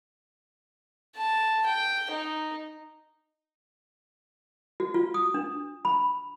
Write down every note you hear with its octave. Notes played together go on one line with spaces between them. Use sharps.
A5
G5
D#4
F#4
F4
D#6
D4
B5